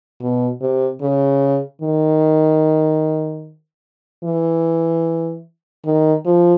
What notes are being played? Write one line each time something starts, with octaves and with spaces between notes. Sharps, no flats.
B2
C3
C#3
D#3
E3
D#3
F3